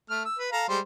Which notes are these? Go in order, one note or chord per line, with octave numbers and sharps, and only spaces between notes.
A3 F6
E6
B4
A4 F5 A#5
G3 G#3 C5